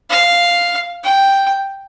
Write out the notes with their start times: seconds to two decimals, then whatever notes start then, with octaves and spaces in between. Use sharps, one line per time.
0.10 F5
1.04 G5